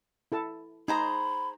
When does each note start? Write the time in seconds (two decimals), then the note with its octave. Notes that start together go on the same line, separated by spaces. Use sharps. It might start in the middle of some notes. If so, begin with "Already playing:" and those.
0.32 E4 A4 A5
0.88 D#4 G#4 C5 A#5 B5